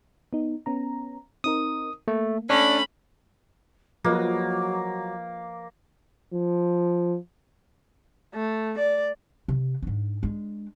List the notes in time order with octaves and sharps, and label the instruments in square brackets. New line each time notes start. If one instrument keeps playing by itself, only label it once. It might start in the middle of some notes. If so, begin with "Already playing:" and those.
[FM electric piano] B3 D#4
B3 C#4 A#5
[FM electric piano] C4 D#4 A#4 [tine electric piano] D#6
[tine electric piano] A3 [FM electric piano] A#3
[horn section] A3 C#4 [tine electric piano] D4 [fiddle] B5
[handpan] F3 B4 D#5 [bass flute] F#3 [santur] A#3 [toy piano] F4 G#4 C#5
[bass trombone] F3
[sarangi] A3
D5
[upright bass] C3
G#2 D4
G#3 D4